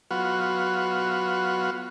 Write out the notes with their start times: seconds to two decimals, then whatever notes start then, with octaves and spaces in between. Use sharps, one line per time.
0.11 F#3 B3 F4 F#4